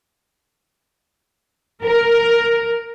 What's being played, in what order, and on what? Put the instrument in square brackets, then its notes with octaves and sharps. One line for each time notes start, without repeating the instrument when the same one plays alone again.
[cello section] A#4